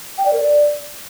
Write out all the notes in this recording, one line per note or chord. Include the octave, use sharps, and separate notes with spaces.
G5
D5
A#4
D5